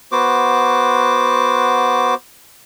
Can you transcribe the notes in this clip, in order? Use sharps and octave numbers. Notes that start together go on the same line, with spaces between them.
B3 F#4 C5 D6